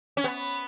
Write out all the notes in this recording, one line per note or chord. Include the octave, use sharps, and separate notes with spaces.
C#4
B3